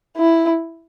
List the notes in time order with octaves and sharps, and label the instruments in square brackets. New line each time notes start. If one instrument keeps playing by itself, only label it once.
[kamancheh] E4